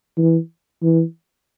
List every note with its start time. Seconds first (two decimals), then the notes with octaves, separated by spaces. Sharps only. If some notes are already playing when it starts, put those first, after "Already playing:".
0.17 E3
0.83 E3